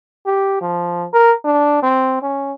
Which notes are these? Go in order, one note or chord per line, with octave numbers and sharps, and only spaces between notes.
G4
F3
A#4
D4
C4
C#4